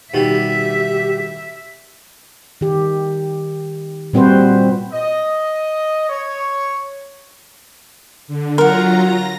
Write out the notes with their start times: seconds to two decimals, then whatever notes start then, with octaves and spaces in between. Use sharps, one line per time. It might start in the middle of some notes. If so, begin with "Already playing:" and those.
0.14 B2 D#3 G3 G4 E5
2.61 D#3 G4
4.13 A#2 G3 C4 F#4 B4 C5
4.92 D#5
6.09 C#5
8.28 D3
8.58 F#3 F4 A#4 F#5 A#5
9.01 A#6